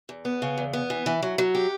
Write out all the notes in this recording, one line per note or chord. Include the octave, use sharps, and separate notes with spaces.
E2
B3
C#3
E2
B3
E3
E3
F#3
F#3
G4